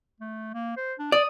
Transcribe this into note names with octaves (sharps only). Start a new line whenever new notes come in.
A3
A#3
C5
D4
D5 D#6